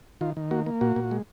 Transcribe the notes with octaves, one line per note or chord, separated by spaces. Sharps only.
D#3 F4
D#3
A#3 F#4
A#3
A#2 F#4
A#2
G#3